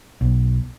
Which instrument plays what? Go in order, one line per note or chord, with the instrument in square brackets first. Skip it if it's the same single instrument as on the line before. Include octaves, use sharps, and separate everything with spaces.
[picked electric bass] B1